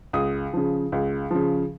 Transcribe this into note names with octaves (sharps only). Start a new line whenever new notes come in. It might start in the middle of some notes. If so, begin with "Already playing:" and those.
C#2 D#6
C#3 F3
C#2
C#3 F3